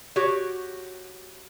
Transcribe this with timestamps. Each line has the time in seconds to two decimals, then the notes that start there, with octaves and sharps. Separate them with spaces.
0.16 F#4 G4 C#5